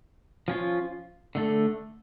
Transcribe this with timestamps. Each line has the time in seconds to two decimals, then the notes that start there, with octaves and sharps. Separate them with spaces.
0.48 F3 C#4 F4
1.35 D3 A3 D4